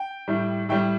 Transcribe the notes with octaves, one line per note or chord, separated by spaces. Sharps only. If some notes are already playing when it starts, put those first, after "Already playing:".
Already playing: G5
A2 G3
A2 G3 G5